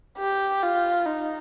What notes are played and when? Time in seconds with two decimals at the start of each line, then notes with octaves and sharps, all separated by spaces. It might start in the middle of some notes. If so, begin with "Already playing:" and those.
0.18 G4
0.62 F4
1.06 D#4